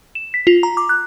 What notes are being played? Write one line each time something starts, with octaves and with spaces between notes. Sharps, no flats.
E7
B6
F4
A#5
D6
F#6